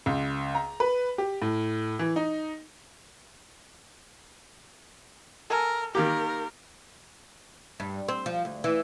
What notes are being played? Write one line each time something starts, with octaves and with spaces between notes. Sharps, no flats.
C#2
A#5
B4
G4
A2
E3
D#4
A4 A#4 G#5
D#3 A#3 G4 A#4
G2
C4
F3
D2
E3